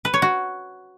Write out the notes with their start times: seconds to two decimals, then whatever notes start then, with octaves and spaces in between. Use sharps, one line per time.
0.05 B4
0.14 C#5
0.22 F#4